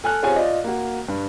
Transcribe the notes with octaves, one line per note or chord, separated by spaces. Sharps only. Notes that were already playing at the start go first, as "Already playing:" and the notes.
A4 G#5 F6 F#6
C4 F4 G4 G#4 C#5 G#5
F4 D5 D#5
A#3 F#4
G2